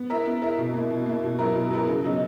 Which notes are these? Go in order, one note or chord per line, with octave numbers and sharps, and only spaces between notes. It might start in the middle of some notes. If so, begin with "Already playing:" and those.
Already playing: B3
E4 A#4 E5
B3
E4 A#4 E5
B2
A#3 E4
B2
A#3 E4
B2
F#3 B3 E4 A#4
B2
F#3 B3 E4 A#4
C#3
F#3 B3 D#4